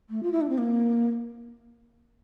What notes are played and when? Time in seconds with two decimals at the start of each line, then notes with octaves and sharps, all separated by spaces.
0.10 A3
0.23 F4
0.32 E4
0.41 D4
0.49 C4
0.58 A#3